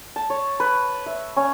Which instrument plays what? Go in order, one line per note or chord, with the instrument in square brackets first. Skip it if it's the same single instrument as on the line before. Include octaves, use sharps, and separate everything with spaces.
[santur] A5
C#5
B4
E5
C#4